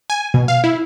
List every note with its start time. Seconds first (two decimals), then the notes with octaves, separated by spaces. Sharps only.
0.10 G#5
0.34 B2
0.48 F5
0.64 E4